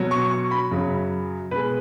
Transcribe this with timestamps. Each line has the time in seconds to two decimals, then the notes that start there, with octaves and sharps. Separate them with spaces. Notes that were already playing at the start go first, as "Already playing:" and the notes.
Already playing: B2 F#3
0.11 C#6
0.31 C#6
0.51 B5
0.71 F#2 C#3 F#3
1.51 B2 G#3 B4